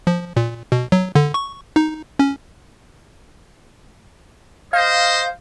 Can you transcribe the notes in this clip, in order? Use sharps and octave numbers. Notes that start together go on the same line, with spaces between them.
F3
A#2
B2
F#3
D3
C#6
D#4
C#4
C5 D#5 F5